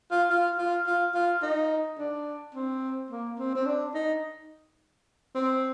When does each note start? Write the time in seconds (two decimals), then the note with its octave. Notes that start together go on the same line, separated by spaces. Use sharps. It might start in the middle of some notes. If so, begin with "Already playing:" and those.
0.11 F4
0.30 F4
0.58 F4
0.86 F4
1.14 F4
1.42 D#4
1.98 D4
2.55 C4
3.11 A#3
3.39 C4
3.55 C4
3.66 D4
3.94 D#4
5.35 C4